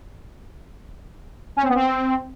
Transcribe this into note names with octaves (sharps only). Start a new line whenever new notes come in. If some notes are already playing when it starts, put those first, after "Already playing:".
C#4
C4
B3
C4